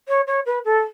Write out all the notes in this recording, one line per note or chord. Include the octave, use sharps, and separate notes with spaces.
C#5
C#5
B4
A4